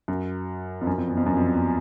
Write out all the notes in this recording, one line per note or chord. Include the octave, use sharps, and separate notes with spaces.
F#2
F2
F#2
F2
E2
F2
F#2
F2
E2